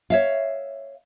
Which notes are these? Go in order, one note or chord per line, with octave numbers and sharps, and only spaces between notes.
C#5 E5 F5